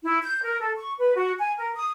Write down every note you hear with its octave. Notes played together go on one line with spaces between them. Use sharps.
E4
G6
A#4
A4
C#6
B4
F#4
G#5
A#4
D#6